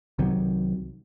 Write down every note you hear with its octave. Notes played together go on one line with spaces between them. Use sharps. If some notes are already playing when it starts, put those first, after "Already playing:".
C2 C3 D#3 F#3